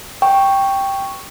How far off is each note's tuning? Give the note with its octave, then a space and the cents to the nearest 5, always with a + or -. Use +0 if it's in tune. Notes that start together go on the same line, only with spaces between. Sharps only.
G5 +0 C#6 +0